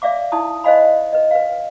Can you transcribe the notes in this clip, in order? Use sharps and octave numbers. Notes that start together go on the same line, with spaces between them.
D5 E5 F5 D6
D#4 E4 A5 D#6
C5 D5 D#5 F5 G#5 B5
B4 D#5
B4 F5